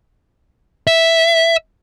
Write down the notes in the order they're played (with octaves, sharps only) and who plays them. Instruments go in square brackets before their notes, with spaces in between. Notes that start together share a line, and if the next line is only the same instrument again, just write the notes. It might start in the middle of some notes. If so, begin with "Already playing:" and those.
[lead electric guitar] E5